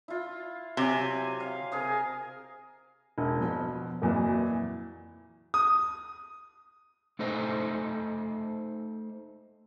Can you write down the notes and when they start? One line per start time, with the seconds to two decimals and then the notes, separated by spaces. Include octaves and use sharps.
0.08 E4 F4
0.77 C3 F#3 G4 G#5
1.40 F5
1.72 C3 G#4 A#4
3.18 E1
3.41 B2 F3
4.02 F2 A#2 E3 F#3
5.54 D#6
7.19 A3 D#4 A4 C5 D#5